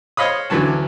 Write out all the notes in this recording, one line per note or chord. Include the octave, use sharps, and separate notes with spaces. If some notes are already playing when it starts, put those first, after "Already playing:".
C5 C#5 D#5 F5 B5 D#6
D2 D3 E3 F#3 C#4 A5